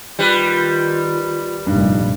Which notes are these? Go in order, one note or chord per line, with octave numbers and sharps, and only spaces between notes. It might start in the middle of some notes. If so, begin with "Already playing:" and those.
D#3 G3 F4 B4
F1 G2 A#2 G3 D#4